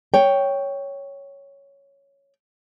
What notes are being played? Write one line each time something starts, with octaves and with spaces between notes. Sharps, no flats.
C#5 G5